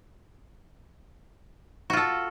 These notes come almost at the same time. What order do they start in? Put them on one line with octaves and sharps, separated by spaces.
F#4 F4 A4